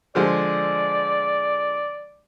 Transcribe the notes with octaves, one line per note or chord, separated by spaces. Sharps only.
D3 F3 G#3 D5